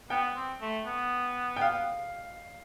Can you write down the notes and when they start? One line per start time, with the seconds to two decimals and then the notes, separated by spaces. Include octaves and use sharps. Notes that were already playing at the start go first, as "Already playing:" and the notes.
0.10 B3 G5
0.36 C4
0.61 A3
0.86 B3
1.56 G5
1.61 F5